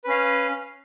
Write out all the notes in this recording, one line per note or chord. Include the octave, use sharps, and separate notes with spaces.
C#4 B4 F5